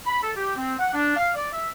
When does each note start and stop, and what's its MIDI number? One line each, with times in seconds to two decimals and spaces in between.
0.06 0.22 83
0.22 0.31 69
0.36 0.56 67
0.56 0.74 60
0.79 0.93 78
0.93 1.14 62
1.17 1.30 77
1.35 1.47 74
1.52 1.69 76